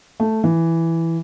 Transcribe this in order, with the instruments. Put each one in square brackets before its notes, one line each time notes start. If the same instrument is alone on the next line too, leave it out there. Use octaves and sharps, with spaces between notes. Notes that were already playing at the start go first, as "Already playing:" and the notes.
[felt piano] A3
E3